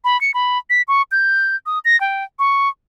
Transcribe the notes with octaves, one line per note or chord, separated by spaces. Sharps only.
B5
C#7
B5
B6
C#6
G6
D#6
A#6
G5
C#6